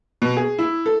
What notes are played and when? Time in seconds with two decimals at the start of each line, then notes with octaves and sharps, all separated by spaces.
0.22 B2
0.37 G#4
0.59 E4
0.86 A4